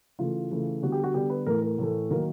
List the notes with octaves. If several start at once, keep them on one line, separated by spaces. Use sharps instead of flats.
C#3 E3 A3 F4
C#3 E3 A3
D3 G3 B3 F#4
G4
F#4
D3 G3 B3 G4
B4
A2 E3 A3 A#4
A#4
A2 E3 A3
D#3 F#3 A#3 A#4